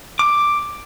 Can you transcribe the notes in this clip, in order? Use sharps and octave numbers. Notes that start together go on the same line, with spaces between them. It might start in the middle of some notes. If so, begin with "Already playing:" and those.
D6